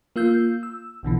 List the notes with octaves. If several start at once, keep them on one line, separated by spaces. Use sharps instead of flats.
A#3 F4 E6 G6
E6
A#1 B2 D3 E3